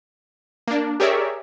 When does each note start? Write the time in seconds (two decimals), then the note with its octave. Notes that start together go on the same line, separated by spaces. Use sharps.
0.68 A#3 D4
1.00 G4 G#4 A#4 C#5 D5 E5